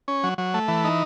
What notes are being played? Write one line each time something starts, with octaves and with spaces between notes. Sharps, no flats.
C#4
F#3
F#3
A3
E3
D#4